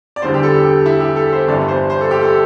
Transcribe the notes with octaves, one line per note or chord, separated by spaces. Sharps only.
D5
E2 D3 G3 C5
G4
A4
G4
E4
G4
A4
C5
G1 G2 E3 G3 D5
C5
C5
A4
G4
A4